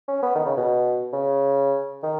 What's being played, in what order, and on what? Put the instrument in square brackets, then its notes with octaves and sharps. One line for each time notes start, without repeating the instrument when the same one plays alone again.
[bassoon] C#4
B3
D#3
C#3
B2
C#3
D#3